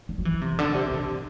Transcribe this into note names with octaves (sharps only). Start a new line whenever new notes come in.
G3
F#3
E3
C3
D3
C3
B2